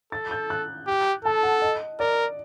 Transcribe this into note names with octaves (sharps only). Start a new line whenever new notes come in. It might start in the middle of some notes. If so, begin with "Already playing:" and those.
A4 A6
G6
F#6
G4
A4 A5
F#5
D#5
A#4 D5